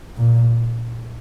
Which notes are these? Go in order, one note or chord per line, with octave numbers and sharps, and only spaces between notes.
A#2